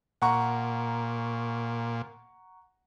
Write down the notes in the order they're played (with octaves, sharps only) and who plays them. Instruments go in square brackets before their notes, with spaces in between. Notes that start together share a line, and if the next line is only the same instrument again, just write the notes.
[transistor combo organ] A#2 [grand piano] F#5 A#5 C#6